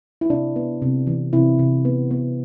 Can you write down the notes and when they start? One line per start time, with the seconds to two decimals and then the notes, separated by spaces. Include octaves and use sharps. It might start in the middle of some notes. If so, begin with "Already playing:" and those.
0.21 E4
0.30 C3 D4
0.56 B3
0.82 C3
1.07 E3
1.33 C3 E4
1.59 C3
1.85 B3
2.11 B3